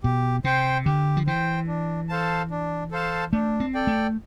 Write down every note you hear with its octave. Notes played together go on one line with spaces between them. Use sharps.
B2 G4
C3 C5 G5
D3 G4
F3
E3 C5 G5
D4
A4 C5 F5 A5
D4
A4 C5 F5 A5
A3 D4
C4
A4 D5 G5
A3